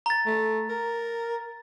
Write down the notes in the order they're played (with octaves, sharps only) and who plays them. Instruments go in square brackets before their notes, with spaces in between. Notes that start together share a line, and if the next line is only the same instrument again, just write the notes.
[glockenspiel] A#5 A6
[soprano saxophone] A3
A#4